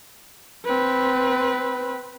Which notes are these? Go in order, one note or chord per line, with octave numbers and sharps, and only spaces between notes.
C4 B4